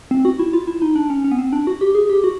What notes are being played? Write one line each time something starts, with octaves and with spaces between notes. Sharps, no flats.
C4
F#4
E4
F4
E4
D#4
D4
C#4
C#4
B3
C4
D4
F#4
G4
G#4
G4
F#4